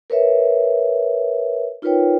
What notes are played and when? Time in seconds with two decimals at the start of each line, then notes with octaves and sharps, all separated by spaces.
0.10 A#4 B4 C#5 E5
1.82 D#4 F4 A#4 B4 C#5 G5